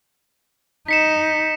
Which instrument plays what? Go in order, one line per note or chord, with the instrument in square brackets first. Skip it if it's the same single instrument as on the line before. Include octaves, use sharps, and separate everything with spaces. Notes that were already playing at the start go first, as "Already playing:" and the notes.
[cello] D#4 [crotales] B6 C#7 E7